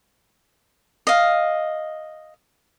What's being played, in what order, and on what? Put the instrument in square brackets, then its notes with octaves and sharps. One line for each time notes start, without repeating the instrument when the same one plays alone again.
[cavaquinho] D#5 F5